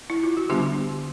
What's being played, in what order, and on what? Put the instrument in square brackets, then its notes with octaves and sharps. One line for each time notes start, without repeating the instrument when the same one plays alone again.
[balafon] E4
F4
F#4
D3 G3 B3 D4 F4 G4